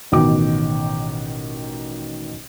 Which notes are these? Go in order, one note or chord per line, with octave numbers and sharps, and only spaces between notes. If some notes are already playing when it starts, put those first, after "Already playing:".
A1 B2 D#3 F#4 G5 D6